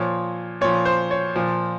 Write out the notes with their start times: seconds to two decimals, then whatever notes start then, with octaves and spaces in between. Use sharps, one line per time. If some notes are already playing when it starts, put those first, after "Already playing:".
Already playing: A#2 F3 C#5
0.61 A#2 F3 C#5
0.85 C5
1.11 C#5
1.36 A#2 F3